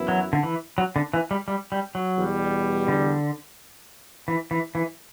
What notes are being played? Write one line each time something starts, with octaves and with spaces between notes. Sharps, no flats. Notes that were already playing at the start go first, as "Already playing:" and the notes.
Already playing: F#2 E3 B3 E4
F#3
D3
E3
F#3
D3
E3
G3
G3
G3
F#3
E2 B2 G3
D3
E3
E3
E3